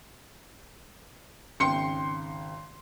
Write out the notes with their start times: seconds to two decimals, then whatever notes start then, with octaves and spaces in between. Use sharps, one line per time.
1.60 G#1 C#3 G5 C6 C#7